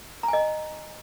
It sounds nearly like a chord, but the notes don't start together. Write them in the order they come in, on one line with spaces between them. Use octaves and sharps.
A#5 G#5 D#5